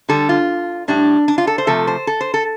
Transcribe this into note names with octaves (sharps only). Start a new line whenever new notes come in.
D3 G3 A4
F4
A2 G3 D4
D4
F4
A4
C5
C3 F3 A3 A4
C5
A4
C5
A4